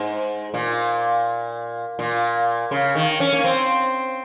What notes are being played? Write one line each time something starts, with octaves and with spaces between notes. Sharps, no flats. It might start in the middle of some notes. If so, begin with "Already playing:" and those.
Already playing: G#2
A#2
A#2
C#3
D#3
C#4
A#3
C4